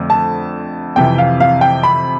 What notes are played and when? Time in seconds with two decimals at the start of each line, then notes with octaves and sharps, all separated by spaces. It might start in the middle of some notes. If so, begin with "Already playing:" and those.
Already playing: F2 D3 A3 C4
0.10 A5
0.96 F2 C3 E3 G5
1.18 F5
1.40 F5
1.61 G5
1.83 B5